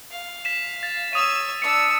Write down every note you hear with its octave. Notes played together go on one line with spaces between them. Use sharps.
F5
B6 E7
A6
C#5 D#6 E6 D#7
D4 E6 C#7